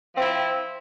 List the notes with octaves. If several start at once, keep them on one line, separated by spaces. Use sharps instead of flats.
F3 C4 E4